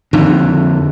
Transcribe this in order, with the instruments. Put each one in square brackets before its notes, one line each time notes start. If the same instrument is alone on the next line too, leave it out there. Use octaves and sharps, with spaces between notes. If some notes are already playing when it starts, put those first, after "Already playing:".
[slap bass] F2 D3 D#3